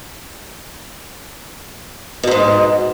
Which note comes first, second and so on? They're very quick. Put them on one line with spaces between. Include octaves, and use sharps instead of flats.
B2 E2 G#2